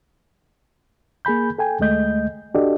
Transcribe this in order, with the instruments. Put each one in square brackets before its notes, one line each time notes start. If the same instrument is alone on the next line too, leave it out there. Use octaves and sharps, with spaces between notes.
[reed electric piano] A#3 G#4 G#5 B5 G6
A4 G5 G#5
D2 G#3 A3 D#5 G6
D4 F#4 G4 A4 D5 D#5